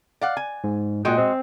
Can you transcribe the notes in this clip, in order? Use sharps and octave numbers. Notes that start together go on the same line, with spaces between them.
D5 F5 F#5
G#5
G#2
A#2 G#3 F#4 D#5 G5
C4